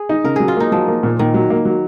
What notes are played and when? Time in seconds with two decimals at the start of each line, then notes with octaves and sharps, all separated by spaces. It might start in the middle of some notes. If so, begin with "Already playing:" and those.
Already playing: G#4
0.09 D#4
0.24 C#3 A#4
0.36 F#3 G#4
0.48 F4
0.57 A#3 D#4
0.72 F3 F#3
0.88 A#3
1.03 A#2
1.19 A#2 D#3
1.34 F#3
1.50 A#3
1.65 F#3